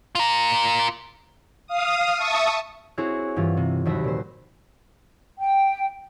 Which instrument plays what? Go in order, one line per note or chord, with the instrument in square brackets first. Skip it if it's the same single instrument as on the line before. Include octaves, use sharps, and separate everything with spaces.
[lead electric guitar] F4 A#4
[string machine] F5 D#6
E5 A5 C#6 D#6
[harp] C4 E4 F#4 G#4 C#5
G2 E3 F4
C3
D#2 C3 F#3 E5 B5 A#6
A#2 C5
[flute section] G5